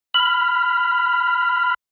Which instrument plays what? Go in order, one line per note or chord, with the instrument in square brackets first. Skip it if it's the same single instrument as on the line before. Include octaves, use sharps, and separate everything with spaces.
[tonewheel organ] B5 F6